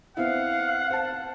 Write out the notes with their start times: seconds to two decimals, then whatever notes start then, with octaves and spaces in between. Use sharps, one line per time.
0.17 B3 C4 E4 F5 F#5
0.91 C5 A5